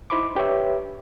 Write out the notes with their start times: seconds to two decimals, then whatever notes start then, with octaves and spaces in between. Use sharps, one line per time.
0.10 D#4 E4 C5 B5 C6 D6
0.35 D4 G4 B4 C#5 E5